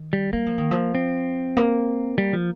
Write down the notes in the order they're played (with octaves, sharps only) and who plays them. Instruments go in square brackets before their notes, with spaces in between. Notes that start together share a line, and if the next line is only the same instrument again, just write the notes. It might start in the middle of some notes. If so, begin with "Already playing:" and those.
Already playing: [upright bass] D#3
[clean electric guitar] G3
[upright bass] G3 [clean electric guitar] A#3
[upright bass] F3
D#3
F3
[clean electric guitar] C4
[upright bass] A#3
[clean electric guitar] G3
F3